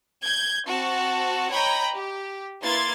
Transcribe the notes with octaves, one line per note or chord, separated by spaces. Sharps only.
G6 G#6
C4 F#4 A5
C#5 D#5 G5 A#5 B5
G4
A#3 E4 B4 C6 G#6 A6